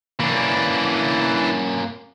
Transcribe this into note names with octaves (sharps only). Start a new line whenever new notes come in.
E3 A#3 C#4 D4